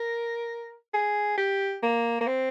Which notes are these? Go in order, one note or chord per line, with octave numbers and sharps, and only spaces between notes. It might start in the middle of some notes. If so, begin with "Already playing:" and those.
Already playing: A#4
G#4
G4
A#3
A#3
C4